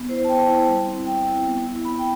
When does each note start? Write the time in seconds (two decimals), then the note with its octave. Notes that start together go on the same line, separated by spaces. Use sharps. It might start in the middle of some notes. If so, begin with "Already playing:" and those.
Already playing: B3
0.09 E4 C5
0.24 A5
0.28 B3 G5
0.48 E4
0.68 G3
0.87 C4 E4
1.06 G3 G5
1.27 C4 E4
1.45 B3
1.66 E4
1.85 B3 B5
1.99 G5